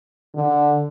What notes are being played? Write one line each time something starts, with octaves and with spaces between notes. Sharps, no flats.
D3